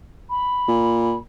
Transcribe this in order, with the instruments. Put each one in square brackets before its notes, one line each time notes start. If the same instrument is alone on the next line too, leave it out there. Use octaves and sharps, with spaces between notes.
[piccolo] B5
[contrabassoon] A#2